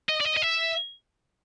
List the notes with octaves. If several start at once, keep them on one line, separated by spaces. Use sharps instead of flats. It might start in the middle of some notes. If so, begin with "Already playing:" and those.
D#5
D5
D#5
D#5
E5